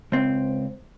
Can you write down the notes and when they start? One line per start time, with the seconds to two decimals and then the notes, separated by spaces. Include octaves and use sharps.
0.12 C#2 C4